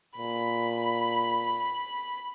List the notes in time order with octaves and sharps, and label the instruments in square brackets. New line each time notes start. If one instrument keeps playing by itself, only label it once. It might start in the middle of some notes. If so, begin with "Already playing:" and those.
[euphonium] A#2 [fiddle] B5